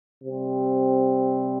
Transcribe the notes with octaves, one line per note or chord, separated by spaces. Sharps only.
C3 G3 C4